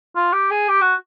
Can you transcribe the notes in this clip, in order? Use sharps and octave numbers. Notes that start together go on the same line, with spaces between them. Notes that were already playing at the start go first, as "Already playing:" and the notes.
F4
G4
G#4
G4
F#4